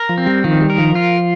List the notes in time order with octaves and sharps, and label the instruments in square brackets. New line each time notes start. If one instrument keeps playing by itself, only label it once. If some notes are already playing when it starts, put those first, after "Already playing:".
Already playing: [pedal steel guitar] A#4
[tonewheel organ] F3
[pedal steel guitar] C4
[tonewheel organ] G3
[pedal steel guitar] D#3 [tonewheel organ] F3
[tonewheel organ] G3
[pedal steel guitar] A#4
[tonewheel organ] F3
[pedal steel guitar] F4